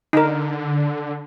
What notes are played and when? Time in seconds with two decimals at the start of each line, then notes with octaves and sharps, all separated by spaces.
0.13 D3 D#4 A#4